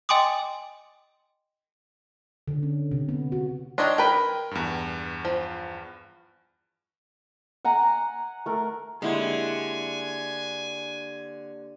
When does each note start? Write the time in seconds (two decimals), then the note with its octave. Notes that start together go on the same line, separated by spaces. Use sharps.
0.09 D#5 G5 G#5 C6 D6 D#6
2.48 D3
2.63 C#4
2.91 C3
3.09 B3
3.32 F#4
3.78 D#3 D4 C#5 D#5 C6
3.98 A#4 B4 G5
4.51 E2 G2
5.25 F3
7.65 F#5 G#5 A#5
8.46 A3 A#4
9.02 D3 G#3 A#3 E4 G4 G#5 C6